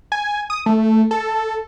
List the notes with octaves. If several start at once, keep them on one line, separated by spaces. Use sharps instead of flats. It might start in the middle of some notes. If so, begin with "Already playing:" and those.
G#5
D#6
A3
A4